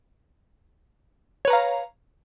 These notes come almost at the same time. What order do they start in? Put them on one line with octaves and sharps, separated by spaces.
C#5 B4 A#5 F5